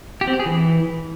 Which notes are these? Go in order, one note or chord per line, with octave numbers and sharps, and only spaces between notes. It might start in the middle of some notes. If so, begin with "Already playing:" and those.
G4
C4
G4
G#4
E3